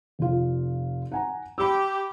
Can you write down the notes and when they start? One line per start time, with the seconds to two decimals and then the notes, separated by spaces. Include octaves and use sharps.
0.19 F1 F4
1.12 F#5 G#5 A#5
1.58 G4 B5 E6